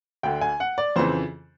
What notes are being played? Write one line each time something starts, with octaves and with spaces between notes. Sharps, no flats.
D2 D3 G5
G#5
F#5
D5
F2 C#3 E3 C5